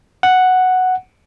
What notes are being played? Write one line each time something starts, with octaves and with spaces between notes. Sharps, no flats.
F#5